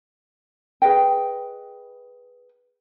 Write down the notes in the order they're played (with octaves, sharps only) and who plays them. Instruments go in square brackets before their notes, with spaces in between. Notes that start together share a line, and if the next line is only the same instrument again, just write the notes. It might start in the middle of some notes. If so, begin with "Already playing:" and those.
[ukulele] G#4 B4 D#5 G5